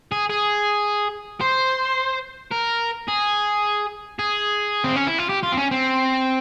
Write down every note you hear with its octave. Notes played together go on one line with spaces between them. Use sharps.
G#4
G#4
C5
A#4
G#4
G#4
C4
C#4
E4
F4
G4
F4
C4
C#4
C4